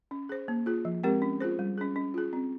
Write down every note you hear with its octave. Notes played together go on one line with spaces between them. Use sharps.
C#4
G#4 C5
A#3
F4 G#4
F3
G#3 C4 G4 A#4
C#4
F4 G#4 C5
G3
C#4 G#4
C#4
F4 G#4
C4